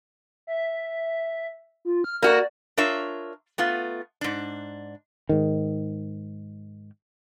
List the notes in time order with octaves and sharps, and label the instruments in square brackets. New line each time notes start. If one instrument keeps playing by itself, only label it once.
[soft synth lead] E5
F4
F6
[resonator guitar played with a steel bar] A#3 F#4 [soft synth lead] D5
[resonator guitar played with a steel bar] D4 F4 A#4 C#5 E5
A3 B3 F4
G#2 D4
[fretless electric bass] G#2 D#3